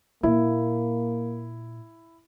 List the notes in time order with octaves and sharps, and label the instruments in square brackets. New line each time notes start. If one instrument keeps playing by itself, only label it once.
[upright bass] A#2 [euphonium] A#3 [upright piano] E4